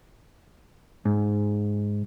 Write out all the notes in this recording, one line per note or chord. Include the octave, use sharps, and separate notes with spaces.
G#2